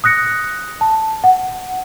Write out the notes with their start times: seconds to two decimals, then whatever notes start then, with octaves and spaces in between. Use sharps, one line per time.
0.04 D#6 F#6 A#6 C#7
0.81 A5
1.24 F#5